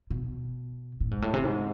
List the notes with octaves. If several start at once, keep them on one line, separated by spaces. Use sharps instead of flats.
B2
A2
G#2
A2
C3
G#2